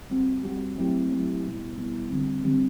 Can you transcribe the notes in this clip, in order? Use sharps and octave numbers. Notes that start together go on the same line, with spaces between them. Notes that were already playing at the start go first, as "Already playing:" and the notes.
G3 C4 F#4
G3 C4 F#4
F#3 A3 C4 E4 G4
F#3 A3 C4 E4 G4
B2 G3 B3 E4
B2 G3 B3 E4
D3 G3 C4
D3 G3 C4